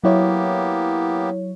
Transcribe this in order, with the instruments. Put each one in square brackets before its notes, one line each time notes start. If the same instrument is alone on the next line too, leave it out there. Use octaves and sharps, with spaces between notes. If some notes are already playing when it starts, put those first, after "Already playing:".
[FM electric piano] F#3 E4 C#5 [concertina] A#3 B3 G4